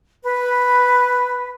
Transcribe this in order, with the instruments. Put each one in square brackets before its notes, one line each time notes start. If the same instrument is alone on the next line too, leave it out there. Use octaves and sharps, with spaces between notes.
[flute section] B4